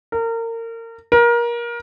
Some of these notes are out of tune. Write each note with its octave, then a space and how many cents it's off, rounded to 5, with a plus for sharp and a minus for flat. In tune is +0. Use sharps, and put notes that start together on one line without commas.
A#4 -30
A#4 +25